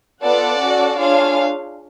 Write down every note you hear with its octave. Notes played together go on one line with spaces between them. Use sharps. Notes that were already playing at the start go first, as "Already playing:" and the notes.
B3 F4 A4 D5 F#5
C#4 F#4 A4
D4 F4 G#4 C#5 F5